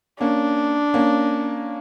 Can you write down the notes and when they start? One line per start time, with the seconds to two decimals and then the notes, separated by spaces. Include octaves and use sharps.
0.20 A#3 C#4 D4
0.94 A#3 C#4